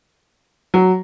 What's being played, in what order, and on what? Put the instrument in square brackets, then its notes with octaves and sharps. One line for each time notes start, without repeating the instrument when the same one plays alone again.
[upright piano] F#3